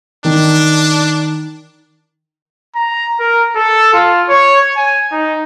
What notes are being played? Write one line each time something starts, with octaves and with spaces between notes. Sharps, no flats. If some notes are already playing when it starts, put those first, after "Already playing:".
D#3 D4
A#5
A#4
A4
F4
C#5
G#5
D#4